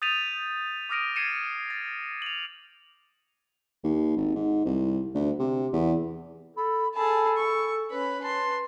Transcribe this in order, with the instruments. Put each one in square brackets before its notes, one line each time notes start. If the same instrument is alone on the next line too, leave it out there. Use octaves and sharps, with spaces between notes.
[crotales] D#6 G6 A6 B6 D#7 F7
D6 D#6 F6 A#6 D7 D#7
G#6 A6 C7 C#7 D#7 E7
A6
F7 F#7
[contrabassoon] D#2
G#1
G#2
C2
D2
C3
E2
[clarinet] A4 [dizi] B5
[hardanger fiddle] G#4 A5 [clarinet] A4 [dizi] B5
[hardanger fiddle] C#6
[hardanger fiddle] C#4 B5 [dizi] B4
[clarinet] A5 [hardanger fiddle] C6